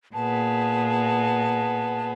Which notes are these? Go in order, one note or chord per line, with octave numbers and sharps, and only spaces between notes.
A#2 B3 G#4 A5